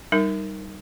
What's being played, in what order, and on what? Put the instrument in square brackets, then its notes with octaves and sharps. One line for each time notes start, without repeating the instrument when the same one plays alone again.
[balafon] G3 D#4 A#4